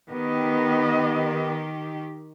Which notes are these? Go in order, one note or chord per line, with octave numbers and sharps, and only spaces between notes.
D#3 B3 G4 D#5